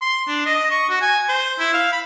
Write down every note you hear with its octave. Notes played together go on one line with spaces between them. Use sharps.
C6
D4
D#5
C#6
F#4
G#5
C5
E4
F5
B5